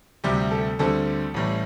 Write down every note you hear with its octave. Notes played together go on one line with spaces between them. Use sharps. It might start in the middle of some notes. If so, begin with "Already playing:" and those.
D2 C3 G3 G4
A4
D2 D3 G3 C4 A4
A1 A2 G3